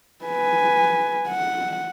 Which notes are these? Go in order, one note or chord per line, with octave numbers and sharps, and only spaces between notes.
B4 G#5
F#5